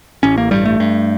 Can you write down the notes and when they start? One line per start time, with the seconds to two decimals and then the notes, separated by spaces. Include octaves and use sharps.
0.23 A1 C#4
0.38 A#3
0.51 G2 G3
0.65 A3
0.80 G2